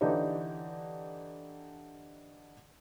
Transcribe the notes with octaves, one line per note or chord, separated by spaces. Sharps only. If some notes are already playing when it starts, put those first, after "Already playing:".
D3 E3 D4 D#4 G4 C#5